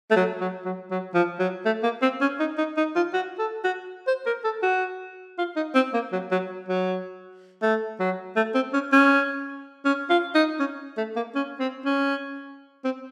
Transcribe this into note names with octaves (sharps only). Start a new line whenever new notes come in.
A3
F#3
F#3
F#3
F#3
F3
F#3
A3
A#3
C4
C#4
D#4
D#4
D#4
F4
F#4
A4
F#4
C5
A#4
A4
F#4
F4
D#4
C4
A#3
F#3
F#3
F#3
A3
F#3
A3
C4
C#4
C#4
C#4
F4
D#4
C#4
A3
A#3
C#4
C4
C#4
C4